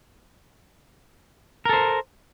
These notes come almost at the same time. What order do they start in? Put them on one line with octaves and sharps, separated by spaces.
A#4 A4 C5